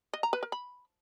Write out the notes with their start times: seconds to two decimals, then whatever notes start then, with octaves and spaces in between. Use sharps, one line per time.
0.13 D#5
0.23 A#5
0.33 B4
0.43 A#4
0.52 B5